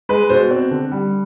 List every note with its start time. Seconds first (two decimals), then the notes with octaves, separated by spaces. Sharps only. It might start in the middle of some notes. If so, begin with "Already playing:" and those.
0.09 G#3 B4
0.29 B2 C5
0.51 C4
0.71 D3
0.92 G3